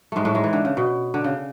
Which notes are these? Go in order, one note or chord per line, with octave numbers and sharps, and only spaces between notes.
G#2 G#3 A3
A2 A3
G#2 G#3
E3
D3
C#3
B2
D3
C#3